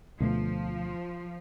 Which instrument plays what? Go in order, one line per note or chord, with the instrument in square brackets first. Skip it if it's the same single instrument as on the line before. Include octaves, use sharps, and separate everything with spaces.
[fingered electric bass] D2 B2 A3 [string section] F3